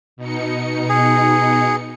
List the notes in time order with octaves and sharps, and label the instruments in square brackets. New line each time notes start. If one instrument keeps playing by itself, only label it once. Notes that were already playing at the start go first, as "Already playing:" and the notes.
[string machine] B2 D#4 C#7
[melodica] G#4